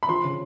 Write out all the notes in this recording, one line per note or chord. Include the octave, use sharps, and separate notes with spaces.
B5
F3 C6
C#3